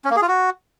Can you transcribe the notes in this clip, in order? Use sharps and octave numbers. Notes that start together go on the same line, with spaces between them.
C#4
A#3
G#4
F4
F#4